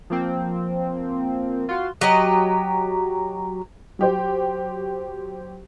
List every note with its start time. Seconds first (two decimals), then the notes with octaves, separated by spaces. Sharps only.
0.10 F3 A#3 C4
1.69 F4 F#4 C6
2.01 F#3 G4 D#5
3.99 F#3 G4 C5